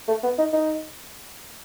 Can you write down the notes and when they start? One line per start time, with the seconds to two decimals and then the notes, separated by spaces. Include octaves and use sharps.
0.08 A3
0.23 B3
0.38 D#4
0.53 D#4